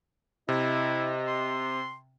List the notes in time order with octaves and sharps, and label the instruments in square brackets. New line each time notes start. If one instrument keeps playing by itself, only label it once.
[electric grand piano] C3 [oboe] E4 [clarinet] D#5
[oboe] C6